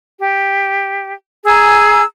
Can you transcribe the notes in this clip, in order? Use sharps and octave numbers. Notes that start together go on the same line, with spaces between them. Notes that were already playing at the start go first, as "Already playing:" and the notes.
G4
G#4 G#5 A#5 E6